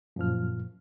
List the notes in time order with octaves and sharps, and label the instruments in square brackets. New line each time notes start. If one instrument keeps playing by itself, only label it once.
[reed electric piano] F#2 A#2 F3 F6